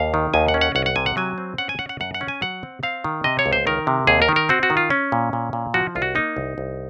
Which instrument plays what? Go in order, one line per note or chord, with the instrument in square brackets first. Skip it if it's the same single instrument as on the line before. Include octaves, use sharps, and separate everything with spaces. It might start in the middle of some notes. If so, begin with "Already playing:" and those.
Already playing: [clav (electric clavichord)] D#2 F5
D#3
D#2 G#5
F#5
C#4
F#5
C2 F#5
F#5
C3 G#5
F#5
F#3 G#5
C4
C#4 F#5
G#5
C#4 F#5
F#5
F#2 F#5
F#5
C#4
G#5
F#3 F#5
C4
C4 F5
D#3
C3 D#5
C#5
C#2
C5
D#3 A#4
C3
D#2 G#4
A#4
D#3
A#4
C4 F#4
F#4
D#3
F4
C#4
A#2
A#2
A#2
F3 F#4
C2 F4
F#4
A#3 D#4
C2
C2